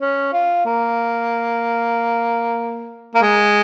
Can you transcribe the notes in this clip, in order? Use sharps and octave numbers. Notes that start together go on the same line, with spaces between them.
C#4
F4
A#3
A#3
G#3